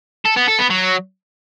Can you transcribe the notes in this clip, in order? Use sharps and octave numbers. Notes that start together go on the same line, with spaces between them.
A4
B3
A4
B3
F#3